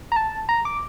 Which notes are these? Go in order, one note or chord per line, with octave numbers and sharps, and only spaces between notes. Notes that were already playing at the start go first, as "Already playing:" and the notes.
A#5
A5
A#5
D6